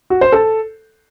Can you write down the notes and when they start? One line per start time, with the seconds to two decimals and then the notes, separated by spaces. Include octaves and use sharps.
0.10 F#4
0.21 C5
0.32 A4